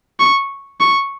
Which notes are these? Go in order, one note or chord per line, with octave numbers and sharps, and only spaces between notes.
C#6
C#6